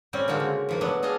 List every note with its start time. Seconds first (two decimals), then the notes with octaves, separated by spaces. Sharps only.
0.13 A2 G3 C4 C#4
0.28 D3 G#3 A#3 C4 F4 F#4
0.40 C#3
0.69 E3 F3 A#3
0.81 F#3 A3 B3 D4
1.03 D4 G#4 A4 D#5 F5